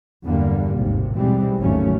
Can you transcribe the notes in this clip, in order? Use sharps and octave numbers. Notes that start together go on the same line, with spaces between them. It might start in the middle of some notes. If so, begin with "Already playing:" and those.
E2 G2 D3 G3 A#3
G#1 D#2 C3
B1 E3 G3 G#3 C4
G1 D#2 G#2 F#3 A3 C#4